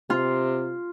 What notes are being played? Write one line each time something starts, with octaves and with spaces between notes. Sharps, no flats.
C3 F4